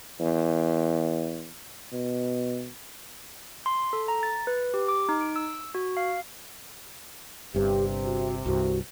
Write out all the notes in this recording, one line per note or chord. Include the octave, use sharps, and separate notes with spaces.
E2
B2
C6
A4
A#5
A6
B4
G4
D6
D#4
D7
E6
F#4
F5
G1 G2 C3 G4
F#4
C2 G2 F#4